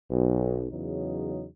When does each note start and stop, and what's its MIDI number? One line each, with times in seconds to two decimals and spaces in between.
0.11 0.67 35
0.72 1.45 40
0.72 1.45 49
0.72 1.45 54
0.72 1.45 63